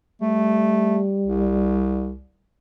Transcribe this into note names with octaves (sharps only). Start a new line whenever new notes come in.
G3 A3
C2